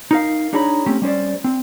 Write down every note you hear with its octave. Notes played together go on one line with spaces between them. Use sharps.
D#4 A#4 F5
D4 D#4 G#4 C#5 A#5 B5
A3 C4 C#4 G4
G3 C#4 C5 D5
C4